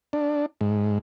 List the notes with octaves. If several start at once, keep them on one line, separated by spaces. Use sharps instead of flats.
D4
G#2